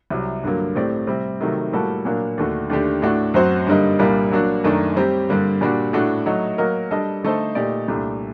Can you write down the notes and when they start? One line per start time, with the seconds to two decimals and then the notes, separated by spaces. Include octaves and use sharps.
0.10 C2 C3 F#3
0.43 G2 D3 F#3 A#3
0.76 A2 A3 C4 G4 D5
1.07 C3 G3 C4
1.40 C3 D#3 F#3 A3
1.72 A2 G3 A#3 F#4 A4
2.05 A#2 F#3 A#3 D4
2.38 D#2 D3 A3 D4 F#4
2.69 D#2 D3 A3 D4 G4
3.02 A2 A3 D4 F#4
3.34 F#2 F#3 C4 F#4 C5
3.67 G2 D3 G3 A#3 D#4
3.99 C2 A#2 G3 A#3 D4
4.31 F#3 A#3 D4 F#4
4.64 F#2 D#3 A3 D4
4.96 G3 C4 G4
5.29 G2 D3 G3 A#3
5.61 A#2 G3 D4 F#4
5.93 A2 A3 D4 F#4
6.26 F#3 A3 D#4 F#4
6.58 F#3 A#3 F#4 A#4 D#5
6.91 G3 D4 A4 D#5
7.23 D3 A3 D#4 A4 C5
7.55 A#2 A3 D#4 G4 D5
7.88 C2 A#2 A3 D4 G4